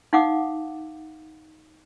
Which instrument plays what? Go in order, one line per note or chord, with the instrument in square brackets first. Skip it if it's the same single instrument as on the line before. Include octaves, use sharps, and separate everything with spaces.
[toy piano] D#4 F5 F#5 D6 D#6